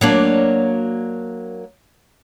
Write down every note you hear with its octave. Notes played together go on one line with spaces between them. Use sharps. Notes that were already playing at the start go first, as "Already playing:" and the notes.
F#3 A#3 D4